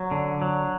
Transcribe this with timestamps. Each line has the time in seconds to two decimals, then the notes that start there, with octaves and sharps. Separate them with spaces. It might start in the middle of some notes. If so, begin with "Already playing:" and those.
Already playing: F#3
0.11 D3
0.42 F#3